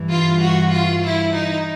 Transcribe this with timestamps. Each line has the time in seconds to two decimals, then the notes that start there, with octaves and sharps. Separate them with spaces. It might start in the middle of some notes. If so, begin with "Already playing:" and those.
Already playing: G2 E3
0.10 F4
0.42 F#4
0.72 F4
1.04 E4
1.34 D#4